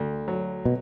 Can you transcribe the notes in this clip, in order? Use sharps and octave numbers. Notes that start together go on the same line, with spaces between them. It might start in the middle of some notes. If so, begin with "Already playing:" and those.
Already playing: D2
F#3
B2